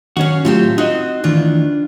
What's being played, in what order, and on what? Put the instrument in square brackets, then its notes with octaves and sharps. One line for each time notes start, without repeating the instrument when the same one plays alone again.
[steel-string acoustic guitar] F#2 C#5 F5 [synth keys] D#3 [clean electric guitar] C#4 F#4
[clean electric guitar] A2 F#3 [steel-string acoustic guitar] A3 C4 G4 [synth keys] F4
[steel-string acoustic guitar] C4 [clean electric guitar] D#4 F#4 D#5 [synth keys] F#6
[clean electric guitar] D2 D#3 E3 [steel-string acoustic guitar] D4 F4